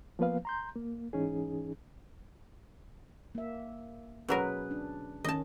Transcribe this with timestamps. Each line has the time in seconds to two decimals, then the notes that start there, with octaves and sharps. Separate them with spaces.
0.19 F3 A#3 B3 B4 F5
0.45 A#5 C6 G6
0.75 A#3
1.13 G#2 E3 C#4 D#4 G#4
3.35 A#3 E5
4.28 B2 F#3 C#4 G#4 A#4 B4
4.71 D4
5.24 D#3 C#4 D#5 A5